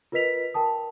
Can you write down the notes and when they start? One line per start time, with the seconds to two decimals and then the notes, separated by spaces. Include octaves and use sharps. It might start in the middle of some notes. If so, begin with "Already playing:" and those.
0.12 F4 A#4 B4 D#5 B6 F7
0.54 A#4 G5 A5 D#6